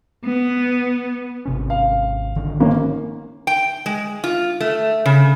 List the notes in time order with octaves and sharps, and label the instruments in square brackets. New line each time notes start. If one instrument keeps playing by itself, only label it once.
[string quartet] B3
[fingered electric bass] G#1 C3 C#4
[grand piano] F5
[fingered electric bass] A1 D3 D#3
[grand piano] G#1 A#3 C#4
[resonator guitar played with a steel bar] G5
G#3
F4
A3
C#3